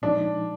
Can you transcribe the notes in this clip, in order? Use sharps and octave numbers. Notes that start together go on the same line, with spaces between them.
A#2 F3 G#3 D4 D#4